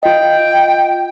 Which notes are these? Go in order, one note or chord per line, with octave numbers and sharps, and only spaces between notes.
F4 D#5 G5